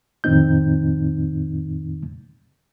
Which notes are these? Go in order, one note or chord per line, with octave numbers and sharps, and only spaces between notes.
F2 A2 D#3 C4 D#4 G6